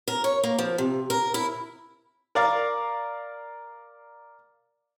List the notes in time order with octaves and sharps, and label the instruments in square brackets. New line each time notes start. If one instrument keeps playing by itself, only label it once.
[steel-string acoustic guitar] A#4
C#5
A#3
F3
C3
A#4
E4
[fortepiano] A#4 D5 F5